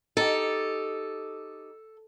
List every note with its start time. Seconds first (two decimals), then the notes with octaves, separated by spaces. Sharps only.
0.17 D#4 G4 A4